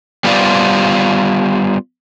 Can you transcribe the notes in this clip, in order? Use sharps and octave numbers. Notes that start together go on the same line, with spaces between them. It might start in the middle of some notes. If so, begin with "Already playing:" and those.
G3 B3 F4 C5 D5